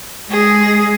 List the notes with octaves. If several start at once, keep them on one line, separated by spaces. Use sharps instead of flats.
G#3 G#4